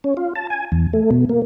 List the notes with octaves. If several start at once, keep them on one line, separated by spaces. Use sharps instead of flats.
C#4
F4
A5
G#5
E2
A3
B2
A#3